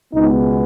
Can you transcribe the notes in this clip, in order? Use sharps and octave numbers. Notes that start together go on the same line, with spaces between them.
C#2 B2 G#3 B3 D#4